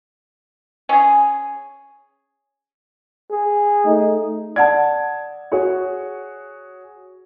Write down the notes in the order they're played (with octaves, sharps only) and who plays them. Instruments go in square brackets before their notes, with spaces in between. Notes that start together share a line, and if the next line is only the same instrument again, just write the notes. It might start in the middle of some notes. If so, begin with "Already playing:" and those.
[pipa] C#4 G#4
[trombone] G#4
[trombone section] A3 D#4
[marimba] D5 F#5 [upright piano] A5 G#6
[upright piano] F#4 G#4 C#5